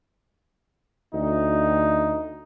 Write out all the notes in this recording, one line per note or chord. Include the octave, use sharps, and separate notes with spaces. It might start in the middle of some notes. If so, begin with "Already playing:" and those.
D2 D#4